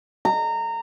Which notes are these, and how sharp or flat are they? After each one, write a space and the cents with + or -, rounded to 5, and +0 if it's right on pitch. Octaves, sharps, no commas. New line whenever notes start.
A#5 -20